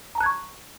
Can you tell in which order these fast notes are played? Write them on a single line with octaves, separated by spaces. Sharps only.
A#5 A5 F#6 G#6 C#6